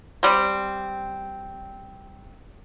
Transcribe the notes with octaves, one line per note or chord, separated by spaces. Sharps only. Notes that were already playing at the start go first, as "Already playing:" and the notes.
G3 C4